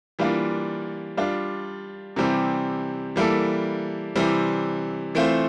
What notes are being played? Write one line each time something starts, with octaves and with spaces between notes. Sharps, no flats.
E3 G3 A#3 D4 F4
G3 D4 F4
C3 E3 G3 C4 G4
E3 G3 A#3 E4 A4
C3 E3 G3 C4
E3 A3 C4 F4 C5